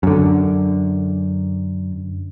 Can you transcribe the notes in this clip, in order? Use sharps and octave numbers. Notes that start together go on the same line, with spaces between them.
F#2 D3